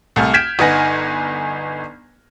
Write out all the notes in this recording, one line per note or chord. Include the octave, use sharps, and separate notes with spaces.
C2 A3 G#5 F6
F6 G6 G#6 B6 D7 E7
G1 D#4 B4 F#5 G#5 A#6